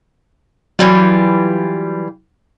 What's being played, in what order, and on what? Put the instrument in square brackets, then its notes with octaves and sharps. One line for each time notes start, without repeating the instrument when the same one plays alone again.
[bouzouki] E3 G3 F4 [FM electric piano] F#3